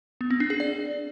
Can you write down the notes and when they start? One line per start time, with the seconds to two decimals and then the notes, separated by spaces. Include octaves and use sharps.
0.21 B3
0.30 C4
0.40 D4
0.50 G#4
0.60 D5